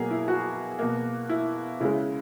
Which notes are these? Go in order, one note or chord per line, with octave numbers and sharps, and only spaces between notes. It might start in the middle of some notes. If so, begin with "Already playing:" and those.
Already playing: B2 F#3 A#3 G#4 A#4
E4
F#4
B2 A#3
E4
C#3 G#3 E4